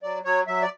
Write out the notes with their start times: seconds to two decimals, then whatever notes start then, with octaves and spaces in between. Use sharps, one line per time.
0.03 F#3 D5
0.24 F#3 C#5
0.47 F#3 E5
0.62 D5